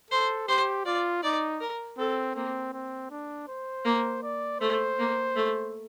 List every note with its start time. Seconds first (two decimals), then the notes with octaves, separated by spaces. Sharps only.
0.11 A4 C5
0.48 G4 C5
0.85 F4 D5
1.23 D#4 D5
1.60 A#4
1.98 C4 A4
2.35 A#3 C4
2.73 C4
3.11 D4
3.48 C5
3.85 A#3
4.23 D5
4.60 A3 C5
4.98 A#3
5.36 A3